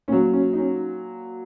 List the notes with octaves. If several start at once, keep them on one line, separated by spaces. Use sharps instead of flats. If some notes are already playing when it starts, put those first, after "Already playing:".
A#2 F#3 C#4
C#4
D#4
C#4